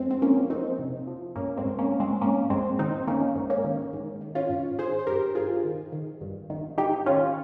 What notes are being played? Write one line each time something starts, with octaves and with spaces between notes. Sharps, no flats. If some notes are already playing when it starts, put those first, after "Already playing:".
Already playing: F2 G#3 C4
C4
F2 A#3 C#4
F2 C4 D#4
C3
F3
G#2 A#3 C#4
G#3 C4
G#2
A#3 C#4
G#2
G#3 C4
G#2 A#3 C#4
G#2 G#3 C4
D#3 C4 D#4
D#3 A#3 C#4
G#2
A#3 C#4
D#3
G#2
D#3
C#4 F4
G#2
D#3 G#4 C5
C5
G2 G4 A#4
G2 F4 G#4
D#3
D#3
G2
D#3
G#2 D#4 G4
D#3 C#4 F4